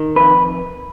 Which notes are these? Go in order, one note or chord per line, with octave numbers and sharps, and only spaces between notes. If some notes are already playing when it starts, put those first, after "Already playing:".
Already playing: D#3
F2 B4